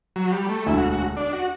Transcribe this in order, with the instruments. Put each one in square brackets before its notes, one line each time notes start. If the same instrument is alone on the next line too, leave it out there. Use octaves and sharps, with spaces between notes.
[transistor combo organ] F#3
G3
A3
[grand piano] E1 D2 D3 [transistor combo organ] E4
[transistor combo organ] F#4
F#4
D4
F#4